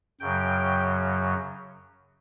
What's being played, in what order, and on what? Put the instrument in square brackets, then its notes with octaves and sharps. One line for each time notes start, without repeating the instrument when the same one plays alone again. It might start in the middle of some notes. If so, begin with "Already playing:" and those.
[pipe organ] F#2 C#3 F#3 G5